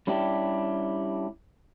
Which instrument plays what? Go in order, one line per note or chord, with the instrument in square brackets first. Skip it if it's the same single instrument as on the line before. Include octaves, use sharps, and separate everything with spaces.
[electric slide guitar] G3 C#4 D4 E4 G4